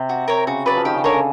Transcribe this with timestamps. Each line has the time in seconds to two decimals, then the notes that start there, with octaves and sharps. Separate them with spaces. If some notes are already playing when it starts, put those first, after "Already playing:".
Already playing: C3
0.09 F#4
0.28 A#4 C#5
0.47 C#3 F#4
0.65 F#3 B4 D5
0.76 F3
0.85 D#3 G4
0.94 C#3
1.04 D3 A#4 C#5
1.14 C#3